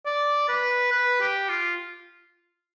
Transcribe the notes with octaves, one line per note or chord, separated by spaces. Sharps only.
D5
B4
B4
G4
F4